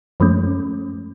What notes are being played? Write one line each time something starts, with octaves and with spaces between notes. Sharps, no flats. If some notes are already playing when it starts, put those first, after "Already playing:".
F#2 F3 G#3 A3 C#4